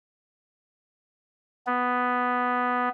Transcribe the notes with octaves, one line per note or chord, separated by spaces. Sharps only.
B3